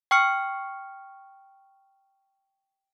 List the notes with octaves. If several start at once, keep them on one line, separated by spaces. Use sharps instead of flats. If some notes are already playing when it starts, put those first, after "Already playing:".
G5 C#6 F6 C#7